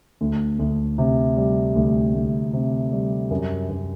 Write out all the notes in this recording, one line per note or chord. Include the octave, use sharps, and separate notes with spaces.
D2
D2
C3
G3
D2
D2
C3
G3
F#2
F#2